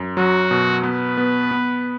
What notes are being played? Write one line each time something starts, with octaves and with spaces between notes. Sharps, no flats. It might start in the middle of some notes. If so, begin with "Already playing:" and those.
Already playing: F#2
F#3 F#4
B2
B3 B4
B3
B3